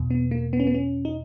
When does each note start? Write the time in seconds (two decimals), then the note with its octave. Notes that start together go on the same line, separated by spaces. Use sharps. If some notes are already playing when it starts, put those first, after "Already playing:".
Already playing: E2 B2
0.10 B3
0.31 A#3
0.53 B3
0.60 C#4
0.67 B3
0.74 C#4
1.05 D#4